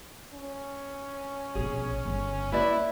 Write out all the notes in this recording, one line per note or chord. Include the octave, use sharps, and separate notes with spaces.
C#4
A#1 B2 G#4
G1
A#3 E4 B4 D5 E5